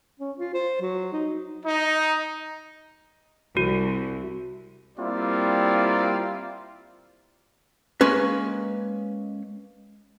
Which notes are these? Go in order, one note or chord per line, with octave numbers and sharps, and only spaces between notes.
C#4
F4
C5
F#3
D#4
D#4
C2 F#4
G3 A#3 C4 E4 F4 D5
G#3 A#3 C#4 B4